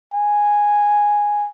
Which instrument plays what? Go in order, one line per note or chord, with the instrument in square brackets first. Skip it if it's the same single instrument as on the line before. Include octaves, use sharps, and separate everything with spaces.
[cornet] G#5